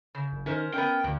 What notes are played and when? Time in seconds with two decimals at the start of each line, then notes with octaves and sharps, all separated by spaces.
0.15 C#3
0.32 F#1
0.46 D#3 C#4 A#4 C5
0.74 B3 C#4 A#4 G5
1.04 D2 G2